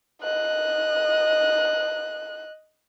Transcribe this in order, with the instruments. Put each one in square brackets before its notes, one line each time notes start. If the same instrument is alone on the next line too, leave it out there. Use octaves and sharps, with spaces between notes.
[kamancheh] D#5 F#6